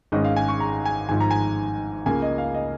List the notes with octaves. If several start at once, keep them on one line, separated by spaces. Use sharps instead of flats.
G#1 G#2 G#3 C#4 D#5
F5
G#5
C#6
A#5
G#5
G#1 G#2 F3 G#5
A#5
G#5
C#2 C#3 A#3 G#5
D#5
F5
D#5